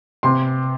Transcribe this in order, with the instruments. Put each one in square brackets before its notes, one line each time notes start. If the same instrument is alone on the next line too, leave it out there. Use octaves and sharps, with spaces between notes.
[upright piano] C3 C6